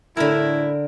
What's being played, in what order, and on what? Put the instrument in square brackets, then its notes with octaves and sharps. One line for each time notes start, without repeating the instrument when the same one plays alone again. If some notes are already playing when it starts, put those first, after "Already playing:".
[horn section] A2 E4 [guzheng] D3 A#4